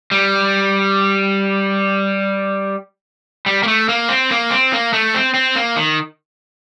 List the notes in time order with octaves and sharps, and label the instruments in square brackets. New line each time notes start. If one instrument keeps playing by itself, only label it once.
[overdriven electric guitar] G3
G3
A#3
A3
A#3
C4
A#3
C4
A#3
A3
C4
C4
A#3
D#3